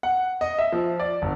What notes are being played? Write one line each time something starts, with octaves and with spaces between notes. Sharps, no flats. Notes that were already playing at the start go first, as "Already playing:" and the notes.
F#5
D#5
E5
F3
D5
G1